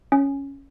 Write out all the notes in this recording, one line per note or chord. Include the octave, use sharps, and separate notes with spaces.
C#4